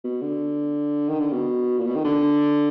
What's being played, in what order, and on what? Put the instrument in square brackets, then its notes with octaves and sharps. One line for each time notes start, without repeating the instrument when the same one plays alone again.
[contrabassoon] B2
D3
D#3
D3
B2
A#2
B2
D#3
D3